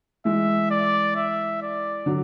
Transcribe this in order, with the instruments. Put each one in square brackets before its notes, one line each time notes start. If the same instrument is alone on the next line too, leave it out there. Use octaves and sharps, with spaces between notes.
[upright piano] E3 G#3 [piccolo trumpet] E5
[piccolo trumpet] D5
E5
D5
[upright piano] D3 F#3